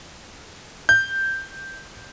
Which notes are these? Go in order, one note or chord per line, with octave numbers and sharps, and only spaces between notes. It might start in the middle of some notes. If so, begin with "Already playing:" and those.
G6